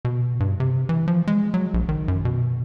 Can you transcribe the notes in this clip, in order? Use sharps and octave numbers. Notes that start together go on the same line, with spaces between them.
B2
G2
C3
E3
F3
G#3
F#3
A#1
D#3
F#2
B2